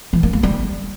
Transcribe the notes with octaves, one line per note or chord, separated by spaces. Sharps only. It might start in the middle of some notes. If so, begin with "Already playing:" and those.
E3
A#3
A#3
G3